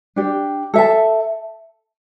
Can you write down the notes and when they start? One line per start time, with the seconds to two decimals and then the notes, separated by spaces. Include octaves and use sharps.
0.16 D4 G4 D5
0.74 A4 E5 A5